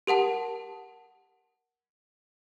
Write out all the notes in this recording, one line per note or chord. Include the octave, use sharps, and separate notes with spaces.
G4 A#4 F#5 A5